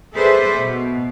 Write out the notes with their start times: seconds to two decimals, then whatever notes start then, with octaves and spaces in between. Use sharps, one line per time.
0.15 G#4 A4 B4 C5 D5 E5
0.58 B2